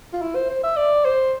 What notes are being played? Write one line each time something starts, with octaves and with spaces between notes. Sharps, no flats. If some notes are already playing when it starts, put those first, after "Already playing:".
F4
E4
C5
C5
E5
D5
C5